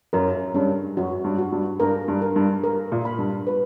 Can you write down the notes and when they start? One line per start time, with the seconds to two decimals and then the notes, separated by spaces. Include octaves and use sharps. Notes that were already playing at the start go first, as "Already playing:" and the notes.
0.13 F#2 A#4
0.54 G2 C#4
0.97 F#2 F#4
1.24 G2
1.38 F#4
1.52 G2
1.80 G2 A#4
2.08 G2
2.22 A#4
2.36 G2
2.64 A#4
2.92 A#2
3.05 B5
3.19 G2
3.47 B4